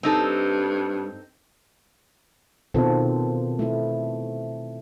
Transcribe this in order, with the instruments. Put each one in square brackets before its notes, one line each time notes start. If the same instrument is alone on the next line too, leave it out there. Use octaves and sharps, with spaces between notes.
[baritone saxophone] G2 [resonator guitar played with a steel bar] C4 D#4 A4
[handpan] B2 D#3 C4 F4 A4
A3 E4